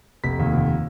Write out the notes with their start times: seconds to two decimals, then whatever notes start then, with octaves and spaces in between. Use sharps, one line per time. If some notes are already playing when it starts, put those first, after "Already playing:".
0.24 F1 B6
0.39 D#2
0.53 F1